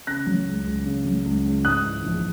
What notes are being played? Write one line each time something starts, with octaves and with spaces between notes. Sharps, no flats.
C#3 F#6 A#6
F#3
C#2
C#2
C#3
F#3
C#2
C#2
G#2 D#6 F#6
E3
A#1